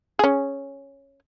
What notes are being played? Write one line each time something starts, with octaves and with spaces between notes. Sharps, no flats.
C#4 G#4